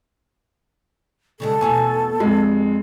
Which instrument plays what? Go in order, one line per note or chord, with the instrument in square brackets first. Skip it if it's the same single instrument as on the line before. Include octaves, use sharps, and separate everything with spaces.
[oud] C#3 G3 G#3 [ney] A4
[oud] E2 B2 A3 [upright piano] G#5
[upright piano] F2 G#3 [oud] G3